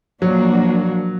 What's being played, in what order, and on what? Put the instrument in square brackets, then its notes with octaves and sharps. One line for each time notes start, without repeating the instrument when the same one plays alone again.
[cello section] A#2 F3 A#3 D4 F#4 [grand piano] F#3